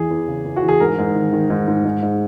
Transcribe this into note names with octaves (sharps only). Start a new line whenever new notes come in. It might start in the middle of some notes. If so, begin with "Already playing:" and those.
Already playing: E2 E3 G#4
E2
C#3
E2
F#4
E3
G#4
G#2 A#4
G#2
D#3
D#3
G#2
G#2
G#2
G#2